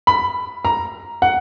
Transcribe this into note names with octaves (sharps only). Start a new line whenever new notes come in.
B5
A#5
F#5